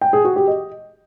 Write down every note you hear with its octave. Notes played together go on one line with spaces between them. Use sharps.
G5
G#4
F#4
G4
D#5